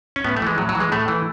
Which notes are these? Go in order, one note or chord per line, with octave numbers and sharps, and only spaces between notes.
C#4
A2 B3
A3
E3 G#3
A2 F#3
F#3
E3
G#3
A2 A3
E3